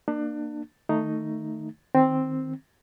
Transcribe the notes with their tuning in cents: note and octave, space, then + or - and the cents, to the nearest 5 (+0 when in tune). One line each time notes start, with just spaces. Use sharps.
A#3 +0 D4 +30
D#3 +0 A3 +15 D#4 +0
D#3 +0 C4 +0